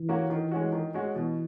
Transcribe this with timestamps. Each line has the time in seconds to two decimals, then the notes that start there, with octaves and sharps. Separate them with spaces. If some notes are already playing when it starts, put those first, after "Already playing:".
Already playing: E3
0.09 A#3 C#4 F#4
0.30 D#3
0.52 G#3 C#4 F#4
0.72 D#3
0.94 G#3 C#4 F#4
1.15 B2 E3